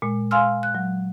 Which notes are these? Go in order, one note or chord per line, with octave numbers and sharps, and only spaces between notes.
A#2 G#3
F5 G#5 C6 E6 F6
F#6
F#3